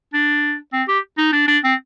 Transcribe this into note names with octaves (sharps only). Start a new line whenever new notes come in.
D4
C4
G4
D#4
D4
D4
C4